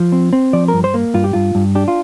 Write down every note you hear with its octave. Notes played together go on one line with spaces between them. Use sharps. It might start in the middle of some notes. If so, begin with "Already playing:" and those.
Already playing: F3
C4
C4
F3 D5
G2 A#4
C5
A#3
G2 F4
G4
G2 F4
G2
D4 G4
F4